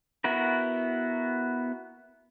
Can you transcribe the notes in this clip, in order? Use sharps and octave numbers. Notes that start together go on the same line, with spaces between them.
B3 E4 F#4 A#4